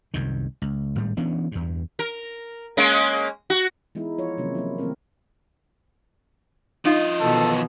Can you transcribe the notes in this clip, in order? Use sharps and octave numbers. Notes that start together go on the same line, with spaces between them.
C2 F#2 D#3
C#2
G#1 A2 G3
E3 B3 C#4 D4
E2 G2
A#4
G#3 A#3 C#4
F#4
E3 G#3 B3 D#4 E4
F3 F4 C#5
C3 D#3 F3 F#3 A#3 C#4
F3 A#3 E4
D#3 F3 A3 C4 A#4
F3 D#4 F4 D#5
B2 D#3 E3 A4